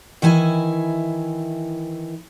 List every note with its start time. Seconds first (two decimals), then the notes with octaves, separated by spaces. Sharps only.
0.22 D#3 E3 E4 G#5